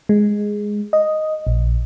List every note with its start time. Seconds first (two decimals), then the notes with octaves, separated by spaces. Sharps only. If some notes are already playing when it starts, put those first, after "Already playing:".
0.09 G#3
0.93 D#5
1.47 A#1